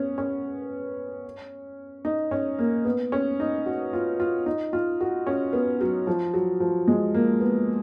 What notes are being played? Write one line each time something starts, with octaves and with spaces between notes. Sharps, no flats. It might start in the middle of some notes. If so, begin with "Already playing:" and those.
Already playing: B3 C#4
C#4
D#4
C#4
A#3
B3
C#4
D#4
F#4
F4
F4
D#4
F4
F#4
C#4
B3
F#3
F3
F#3
F3
G#3
A#3
B3